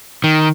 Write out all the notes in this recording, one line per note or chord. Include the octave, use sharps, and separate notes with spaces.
D#3